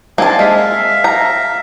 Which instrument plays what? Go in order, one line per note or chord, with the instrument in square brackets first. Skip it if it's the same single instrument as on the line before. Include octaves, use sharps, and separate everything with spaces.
[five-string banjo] A#3 A5 [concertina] C4 D4 G#5
[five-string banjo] G#3 [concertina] E5 F5
[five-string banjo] A#5